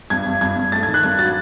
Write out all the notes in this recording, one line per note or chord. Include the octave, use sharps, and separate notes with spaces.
G2 G#6
G2
G2 G#6
G2
A3 A6
G#6
D#3
F#6
G2 G#6
F#3 A6